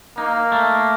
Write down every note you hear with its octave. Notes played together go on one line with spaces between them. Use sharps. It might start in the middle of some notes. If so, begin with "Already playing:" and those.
A#3 D#4
A3